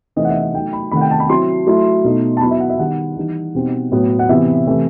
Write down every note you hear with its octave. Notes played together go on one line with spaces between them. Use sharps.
C3 E3 A3 C4 D#4 D#5
F#5
E5
E5
F#3 A3 D#4 G5
B5
C3 D#3 A3 C4 F#5 B5
G5
A5
B5
F#3 C4 E4 C6
F#3 A3 E4
B2 A3 D#4
A5
F#3 B3 E4 B5
E5
F#5
E5
D#3 G3 B3 D#4 F#5
E3 G3 D#4
B2 G3 C4 D#4
A2 F#3 B3
F#5
C3 E3 B3 E4 E5
C3 E3 A3 E4